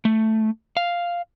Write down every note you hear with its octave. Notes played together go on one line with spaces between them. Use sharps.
A3
F5